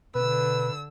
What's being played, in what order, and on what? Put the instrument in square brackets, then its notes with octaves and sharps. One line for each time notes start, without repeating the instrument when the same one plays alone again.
[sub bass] B2 [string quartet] D3 E6 [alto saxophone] B4